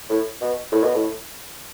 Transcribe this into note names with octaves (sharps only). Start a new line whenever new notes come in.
A2
B2
A2
B2
A2